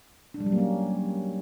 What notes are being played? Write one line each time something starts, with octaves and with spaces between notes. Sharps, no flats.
D4
G3
F#3
A#3
C#4